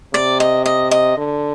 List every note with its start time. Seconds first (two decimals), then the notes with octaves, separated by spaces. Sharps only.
0.14 C3 D5
0.40 D#5
0.66 D#5
0.91 D#5
1.17 D3